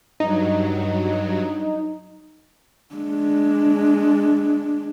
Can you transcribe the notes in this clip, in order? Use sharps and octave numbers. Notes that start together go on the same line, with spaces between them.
G2 F#3 D#4
G#3 D4